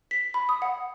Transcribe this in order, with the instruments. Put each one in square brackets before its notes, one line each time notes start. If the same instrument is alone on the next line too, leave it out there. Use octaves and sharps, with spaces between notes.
[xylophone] B6
B5
D#6
F#5